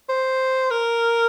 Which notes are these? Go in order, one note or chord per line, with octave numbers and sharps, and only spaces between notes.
C5
A#4